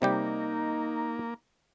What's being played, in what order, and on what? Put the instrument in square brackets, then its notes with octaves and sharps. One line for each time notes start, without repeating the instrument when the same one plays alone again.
[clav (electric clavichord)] C3 G3 G4 [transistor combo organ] A#3 [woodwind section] D#4